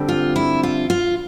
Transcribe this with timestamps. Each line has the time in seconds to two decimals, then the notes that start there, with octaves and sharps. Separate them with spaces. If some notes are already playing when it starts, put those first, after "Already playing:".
Already playing: D3 G3 C4
0.08 F4
0.36 E4
0.63 F4
0.90 F4